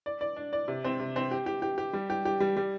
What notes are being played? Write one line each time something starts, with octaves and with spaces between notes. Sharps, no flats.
D5
D5
D4
D5
C3
C4
C3
C4
G4
G4
G4
G4
G3
G4
G4
G3
G3